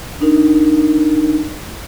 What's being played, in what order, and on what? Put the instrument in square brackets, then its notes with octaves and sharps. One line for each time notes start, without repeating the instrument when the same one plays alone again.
[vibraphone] D4 D#4 A#4